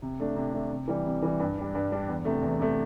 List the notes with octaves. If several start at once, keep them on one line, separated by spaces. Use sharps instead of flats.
C3
A3 D4
C3
A3 D4
C3
E3 G3
C3
E3 G3
G2
G3 D4
G2
G3 D4
E2
C3 A3
E2
C3 A3